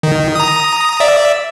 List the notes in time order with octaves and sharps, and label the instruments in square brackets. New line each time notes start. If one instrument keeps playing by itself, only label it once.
[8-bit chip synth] D#3
A#5 D#6
D5 E5